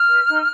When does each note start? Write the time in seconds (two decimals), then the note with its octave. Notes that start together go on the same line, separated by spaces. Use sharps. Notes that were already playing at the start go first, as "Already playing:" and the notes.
Already playing: F6
0.08 B4
0.27 D#4